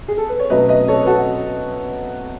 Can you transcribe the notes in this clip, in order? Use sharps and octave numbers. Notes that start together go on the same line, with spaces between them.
G#4
A4
B4
C#5
B2 F#3 A3 C#4 B4 D#5
B4 D#5
A4 C#5
B4
F#4 A4